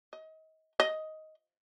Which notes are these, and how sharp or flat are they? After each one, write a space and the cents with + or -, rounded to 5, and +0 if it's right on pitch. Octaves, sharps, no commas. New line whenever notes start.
D#5 +30
D#5 +10